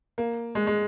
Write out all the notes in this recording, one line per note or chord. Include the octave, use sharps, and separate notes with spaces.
A#3
G#3
G#3